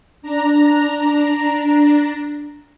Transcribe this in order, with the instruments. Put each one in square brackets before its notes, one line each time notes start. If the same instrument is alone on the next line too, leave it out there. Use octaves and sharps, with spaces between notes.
[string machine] D4 A#5